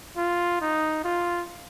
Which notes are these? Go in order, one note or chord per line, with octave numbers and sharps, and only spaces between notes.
F4
D#4
F4